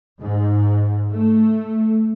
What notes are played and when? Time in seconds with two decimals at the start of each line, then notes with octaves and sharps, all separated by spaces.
0.20 G#2
1.11 A3